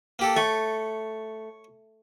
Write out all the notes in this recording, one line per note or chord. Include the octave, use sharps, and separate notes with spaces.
A#3 G4 A4
A3 C#5 C#6